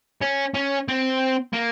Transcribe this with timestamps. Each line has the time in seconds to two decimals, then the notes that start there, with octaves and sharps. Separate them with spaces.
0.21 C#4
0.54 C#4
0.88 C4
1.53 A#3